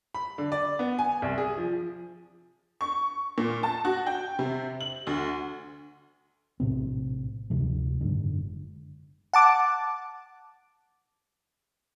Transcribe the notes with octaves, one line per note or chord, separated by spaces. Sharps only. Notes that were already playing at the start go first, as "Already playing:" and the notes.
B5
D3
D5
B3
G#5
C2
G#4
F3
C#6
A#2
A5
F#4
G5
C3
F#7
D2
A#1 A2 C3 C4
D2 G2 C3 F3
F#1 G#2 D3
F#5 A5 D6